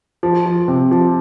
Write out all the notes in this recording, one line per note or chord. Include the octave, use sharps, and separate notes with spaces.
F3
F3
C3
F3